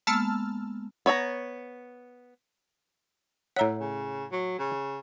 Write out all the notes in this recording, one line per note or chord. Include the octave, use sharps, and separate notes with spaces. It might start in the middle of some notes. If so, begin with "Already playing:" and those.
G#3 A#3 B3 A5 E6 F6
B3 C#5 D#5 A#5
A2 C#5 E5 F#5 A#5
C#3
F#3
C#3